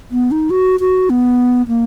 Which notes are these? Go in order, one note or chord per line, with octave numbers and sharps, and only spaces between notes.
B3
D#4
F#4
F#4
B3
A#3